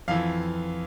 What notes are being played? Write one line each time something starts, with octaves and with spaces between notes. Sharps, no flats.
F2 E3 F5